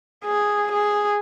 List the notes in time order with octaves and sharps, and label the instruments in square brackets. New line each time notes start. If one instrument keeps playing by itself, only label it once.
[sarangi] G#4
G#4